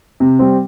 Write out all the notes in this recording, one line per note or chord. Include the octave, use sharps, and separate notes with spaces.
C3
G3 C4